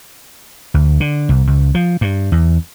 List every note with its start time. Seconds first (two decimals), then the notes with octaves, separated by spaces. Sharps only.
0.74 D2
1.00 D3
1.29 C2
1.47 C#2
1.75 F3
2.01 G2
2.32 E2